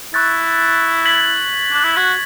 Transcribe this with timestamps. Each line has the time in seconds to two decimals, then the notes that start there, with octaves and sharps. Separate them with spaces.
0.14 E4 C#6 F#6 A6
1.05 G#6 B6 F#7
1.72 D4
1.84 E4
1.97 F#4 G#6 B6 F#7